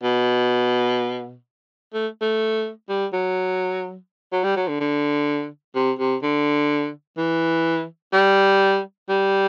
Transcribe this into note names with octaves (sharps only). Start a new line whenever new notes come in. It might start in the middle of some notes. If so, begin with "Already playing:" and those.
B2
A3
A3
G3
F#3
F#3
G3
F#3
D3
D3
C3
C3
D3
E3
G3
G3